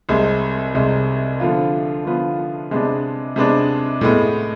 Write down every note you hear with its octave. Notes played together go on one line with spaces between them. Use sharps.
C2 C3 G#3
C2 C3 G#3
D3 F3 B3 F4
D3 F3 B3 F4
C3 G#3 B3 D4
C3 G#3 B3 D4
A2 G#3 B3